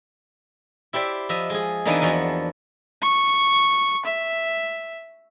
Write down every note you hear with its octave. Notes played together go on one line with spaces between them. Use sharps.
E4 G4 C5 D5 E5
F3 D#5 E5
G#3 G#4
E3 F3 A#3 B3 D4 D#4
E2 F3 F#4 F#5
C#6
E5